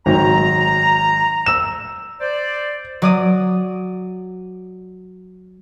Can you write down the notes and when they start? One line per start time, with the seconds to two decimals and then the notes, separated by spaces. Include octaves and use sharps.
0.06 G#1 F#3 A#5
1.46 E6 E7
2.21 C5 D5
3.02 F#3 D5 D#6